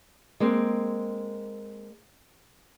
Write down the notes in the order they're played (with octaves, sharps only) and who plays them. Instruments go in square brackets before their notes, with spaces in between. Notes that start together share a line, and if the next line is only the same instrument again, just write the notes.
[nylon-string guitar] G#3 A#3 C4